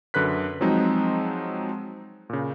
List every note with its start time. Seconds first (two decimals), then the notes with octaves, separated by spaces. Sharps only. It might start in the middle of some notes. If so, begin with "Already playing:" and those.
0.14 F#2 D3 B4 F#6 B6
0.61 F3 F#3 G#3 C4 D#4
2.30 A#2 C#3